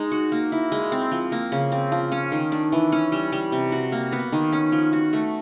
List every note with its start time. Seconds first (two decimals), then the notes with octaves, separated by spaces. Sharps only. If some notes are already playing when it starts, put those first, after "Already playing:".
Already playing: G#3 D#4
0.12 F#4
0.32 A#3
0.52 E4
0.72 G#3
0.92 C4
1.12 F3
1.32 A#3
1.52 C#3
1.72 C4
1.92 F3
2.12 C#4
2.32 D#3
2.52 D4
2.72 E3
2.92 C#4
3.12 G3
3.32 G3
3.52 C3
3.72 F#4
3.92 A#3
4.12 B3
4.32 D#3
4.53 C#4
4.72 F3
4.93 F#4
5.13 A3